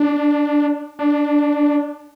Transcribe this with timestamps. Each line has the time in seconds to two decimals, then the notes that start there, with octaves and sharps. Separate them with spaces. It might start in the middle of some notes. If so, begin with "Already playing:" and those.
Already playing: D4
0.99 D4